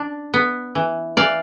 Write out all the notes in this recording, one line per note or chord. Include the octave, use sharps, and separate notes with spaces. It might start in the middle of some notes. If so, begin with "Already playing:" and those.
Already playing: D4
B3
E3
E3 D5 F5